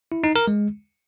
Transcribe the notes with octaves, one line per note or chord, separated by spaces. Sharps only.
E4
D#4
A#4
G#3